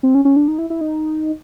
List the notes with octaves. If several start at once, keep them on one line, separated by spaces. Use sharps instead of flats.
C4
C#4
C#4
D4
D#4
E4
E4
D#4